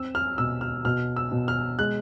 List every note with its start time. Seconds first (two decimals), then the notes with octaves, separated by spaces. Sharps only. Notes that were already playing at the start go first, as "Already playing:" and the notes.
Already playing: C4 E6
0.15 F6
0.38 B2 E6
0.61 F6
0.85 B2 F6
1.16 E6
1.32 B2
1.48 F6
1.79 G#3 F#6